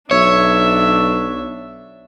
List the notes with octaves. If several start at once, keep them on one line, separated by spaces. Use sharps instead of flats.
B1 D4 C#5 E5